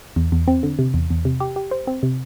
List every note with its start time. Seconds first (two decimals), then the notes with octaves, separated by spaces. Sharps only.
0.16 E2
0.32 E2
0.48 C4
0.63 D3
0.79 C3
0.94 E2
1.10 E2
1.25 C3
1.40 G4
1.56 G4
1.71 C5
1.87 C4
2.03 C3